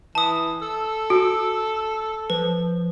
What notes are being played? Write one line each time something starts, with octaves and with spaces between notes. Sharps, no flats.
E3 A5 D#6
A4 E6
F#4
F3 B4